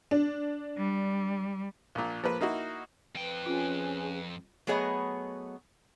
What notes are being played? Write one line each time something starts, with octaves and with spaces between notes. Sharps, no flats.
D4
G3
A#1 A#2
F3 A#3 B4
A#3 D#4 E4 F#4
F2 B4 G5
C#4 F4 G#4 G#5
F#3 A3 B3 G#4 C#5 D#5